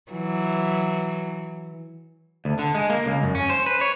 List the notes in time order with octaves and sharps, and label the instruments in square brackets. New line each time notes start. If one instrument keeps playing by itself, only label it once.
[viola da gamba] E3 F#3
[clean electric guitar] D2
D3
G#3
A#3
C#2
F#2
C#4
C5
B4
C#5